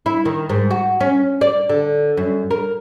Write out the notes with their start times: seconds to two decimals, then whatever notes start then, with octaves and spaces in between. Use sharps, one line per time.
0.06 E4
0.25 D#3
0.49 G#2
0.70 F#4
1.00 C#4
1.41 D5
1.69 D3
2.17 F#2
2.51 A#4